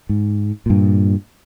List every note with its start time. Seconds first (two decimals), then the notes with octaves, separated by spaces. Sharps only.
0.09 G#2
0.66 G2 A#2